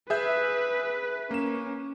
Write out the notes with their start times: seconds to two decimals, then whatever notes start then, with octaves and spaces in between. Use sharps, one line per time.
0.10 G#4 B4 E5 G6
1.31 A#3 C#4 E7